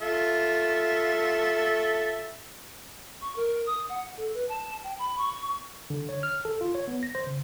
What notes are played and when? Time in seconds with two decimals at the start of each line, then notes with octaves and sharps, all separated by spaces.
0.02 F4 A4 E5
3.21 C#6
3.36 A#4
3.66 D#6
3.89 F#5
4.17 A4
4.34 B4
4.49 A5
4.84 G5
4.99 B5
5.18 C#6
5.90 D3
6.09 C#5
6.23 F6
6.45 A4
6.61 F4
6.75 C#5
6.88 B3
7.03 A#6
7.15 C5
7.27 C#3